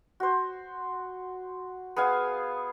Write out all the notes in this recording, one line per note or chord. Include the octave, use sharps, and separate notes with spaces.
F#4 C5
B3 G#4 F5 G#5